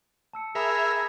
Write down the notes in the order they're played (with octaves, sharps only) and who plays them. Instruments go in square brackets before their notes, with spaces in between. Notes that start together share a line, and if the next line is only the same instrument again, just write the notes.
[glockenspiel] A5 E6 C#7
[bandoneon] G#4 [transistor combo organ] A#4 E5 [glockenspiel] B5 G#6 B6